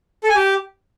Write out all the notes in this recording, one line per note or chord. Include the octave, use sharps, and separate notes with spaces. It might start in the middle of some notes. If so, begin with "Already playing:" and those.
A4
G#5
G4